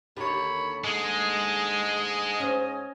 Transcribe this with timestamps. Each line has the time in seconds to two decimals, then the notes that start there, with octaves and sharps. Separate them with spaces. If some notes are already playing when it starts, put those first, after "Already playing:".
0.16 D#2 D3 D#3 G4 C#5 B5
0.84 G#2 G#3 D#5 G#5
2.40 C#4 C5